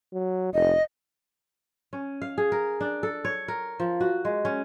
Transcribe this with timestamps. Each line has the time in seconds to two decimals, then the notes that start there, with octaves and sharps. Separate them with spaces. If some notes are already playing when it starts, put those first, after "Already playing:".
0.13 F#3
0.54 F1 D#5
1.93 C#4
2.22 F5
2.38 G#4
2.52 A#4
2.81 D4
3.03 A4
3.25 C#5
3.48 A#4
3.80 F3
4.01 F#4
4.25 G#3
4.45 C#4